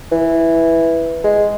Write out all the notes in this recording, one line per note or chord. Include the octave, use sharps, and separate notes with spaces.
E3
G#3